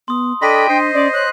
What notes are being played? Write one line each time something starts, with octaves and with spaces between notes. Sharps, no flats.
B3 C6 D#6
D4 A4 D#5 G5 B5 C6 B6 D#7
D4 C5 D#5 C7 D#7
C#4 D5
C#5 F#6